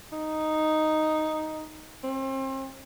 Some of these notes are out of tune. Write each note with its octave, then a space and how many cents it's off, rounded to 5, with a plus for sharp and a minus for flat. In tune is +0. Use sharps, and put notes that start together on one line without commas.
D#4 +0
C4 +35